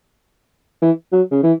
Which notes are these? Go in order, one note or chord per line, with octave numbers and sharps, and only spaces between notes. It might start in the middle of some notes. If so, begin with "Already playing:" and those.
E3
F#3
C#3
E3